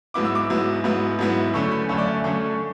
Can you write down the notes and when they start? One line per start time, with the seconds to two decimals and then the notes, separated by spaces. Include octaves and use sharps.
0.14 G#2 F#3 B3 E4 D6
0.25 E6
0.35 D6
0.50 G#2 F#3 B3 E4
0.84 G#2 F#3 B3 E4
1.19 G#2 F#3 B3 E4
1.54 F#2 D3 A3 C#4 C#6
1.71 B5
1.89 F#2 D3 A3 C#4 E5
1.98 D5
2.06 E5
2.24 F#2 D3 A3 C#4 C#6